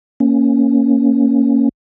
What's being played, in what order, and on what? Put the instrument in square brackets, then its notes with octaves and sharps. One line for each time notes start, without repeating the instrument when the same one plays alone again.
[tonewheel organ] A#3 C#4